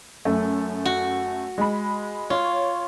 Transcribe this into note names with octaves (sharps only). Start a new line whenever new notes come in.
F#2 A3
F#4
G#3 B5
F4 C#5